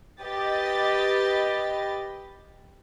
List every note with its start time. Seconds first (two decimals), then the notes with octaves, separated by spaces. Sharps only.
0.23 G4 B4 D#5 A6